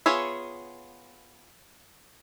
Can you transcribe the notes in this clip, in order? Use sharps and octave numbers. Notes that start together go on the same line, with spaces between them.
B3 F4 G#4 C#5 E5